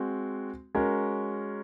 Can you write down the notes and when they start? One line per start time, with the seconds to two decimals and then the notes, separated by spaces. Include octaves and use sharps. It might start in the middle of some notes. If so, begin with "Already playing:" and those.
Already playing: G#3 C4 F#4
0.75 G#3 C#4 F#4 A#4